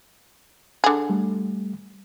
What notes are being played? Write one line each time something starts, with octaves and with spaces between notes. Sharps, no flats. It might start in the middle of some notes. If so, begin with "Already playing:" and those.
D3 G#4
G3 A3